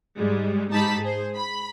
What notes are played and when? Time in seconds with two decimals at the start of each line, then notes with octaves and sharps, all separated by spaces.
0.17 G#2 G3 G#3
0.70 G#2 D#4 G4 A5 B5 B6
1.00 G#4 C5
1.36 B5